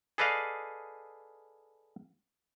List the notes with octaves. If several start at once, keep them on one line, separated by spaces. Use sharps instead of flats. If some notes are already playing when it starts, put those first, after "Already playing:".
G#4 A4 B4 D5 D#5 F5